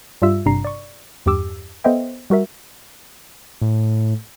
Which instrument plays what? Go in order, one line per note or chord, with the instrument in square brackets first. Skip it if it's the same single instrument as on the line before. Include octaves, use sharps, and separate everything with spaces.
[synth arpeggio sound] G2 G3 F4 E5 E6
G#1 G2 C3 D4 A#5 C7
D5 C#6
E2 G2 G4 D6 E6
B3 A4 C5 D#5 E5 G5
G3 F#4 A#4 E5
[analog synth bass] A2